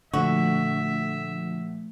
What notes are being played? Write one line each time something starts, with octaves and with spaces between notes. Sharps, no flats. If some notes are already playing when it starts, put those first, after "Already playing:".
A#2 D3 F3 A3 F#4 E5